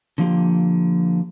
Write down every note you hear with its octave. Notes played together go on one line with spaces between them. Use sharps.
D3 F3 A#3 G4